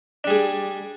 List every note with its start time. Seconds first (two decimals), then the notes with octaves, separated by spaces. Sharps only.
0.24 D4
0.27 G3
0.30 G#4